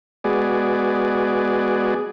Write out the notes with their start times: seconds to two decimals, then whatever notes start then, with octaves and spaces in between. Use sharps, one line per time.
0.24 G#3 B3 F#4 G#4 D5